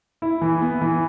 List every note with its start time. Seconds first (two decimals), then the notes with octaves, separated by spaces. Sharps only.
0.22 E4
0.42 E3
0.61 B3
0.82 E3